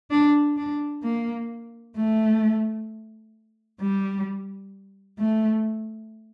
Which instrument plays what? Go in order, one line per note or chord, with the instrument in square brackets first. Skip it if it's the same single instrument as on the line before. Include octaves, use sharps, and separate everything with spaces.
[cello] D4
D4
A#3
A3
G3
A3